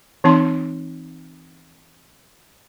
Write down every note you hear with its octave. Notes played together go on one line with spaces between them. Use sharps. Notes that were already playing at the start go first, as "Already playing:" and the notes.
E3 C4 D#4 A5 C6